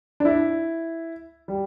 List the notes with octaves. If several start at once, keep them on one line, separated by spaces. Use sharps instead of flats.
D4
E4
G3